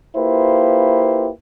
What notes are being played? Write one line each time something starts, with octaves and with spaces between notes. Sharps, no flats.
A#3 E4 F4 G4 B4 C5